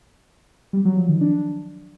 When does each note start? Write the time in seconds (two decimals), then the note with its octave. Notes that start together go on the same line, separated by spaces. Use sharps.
0.73 G3
0.85 F#3
0.97 F3
1.09 D#3
1.21 D4